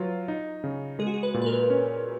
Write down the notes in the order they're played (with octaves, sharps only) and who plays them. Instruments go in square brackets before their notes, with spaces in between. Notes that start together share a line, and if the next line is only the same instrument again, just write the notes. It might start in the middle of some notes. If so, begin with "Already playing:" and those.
Already playing: [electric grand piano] F#3 F4 [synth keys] F#4 B4
[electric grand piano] D#4
C#3
[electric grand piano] G#3 [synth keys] G#4
[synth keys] F#4
G#4
B4
[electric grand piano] A#2
[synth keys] B4
A#4
[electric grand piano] C#4